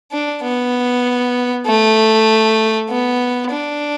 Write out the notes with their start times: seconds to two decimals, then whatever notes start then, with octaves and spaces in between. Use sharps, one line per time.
0.12 D4
0.43 B3
1.66 A3
2.89 B3
3.51 D4